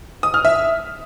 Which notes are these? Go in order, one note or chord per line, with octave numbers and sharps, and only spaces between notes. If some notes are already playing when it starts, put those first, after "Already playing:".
D#6
F6
E5